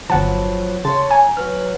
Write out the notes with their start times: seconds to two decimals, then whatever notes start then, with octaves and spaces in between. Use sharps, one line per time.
0.10 G1 F3 F#3 B4 F#5 A5
0.85 C#3 C#5 A5 C6
1.11 G#5 A#5
1.37 F#3 F#4 B4 F6